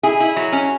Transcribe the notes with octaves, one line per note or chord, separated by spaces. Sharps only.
E4 G#4
E4
F#3
C#4